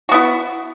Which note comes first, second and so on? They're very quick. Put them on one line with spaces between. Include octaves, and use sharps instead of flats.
F#4 B3 E4